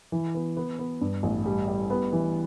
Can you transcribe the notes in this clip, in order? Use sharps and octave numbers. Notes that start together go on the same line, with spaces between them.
E3
B3
B3
B3
G2
A1
G3
G3
B3
E3